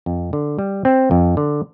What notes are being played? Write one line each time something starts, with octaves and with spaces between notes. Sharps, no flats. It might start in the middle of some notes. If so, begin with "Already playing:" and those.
F2
D3
G3
C4
F2
D3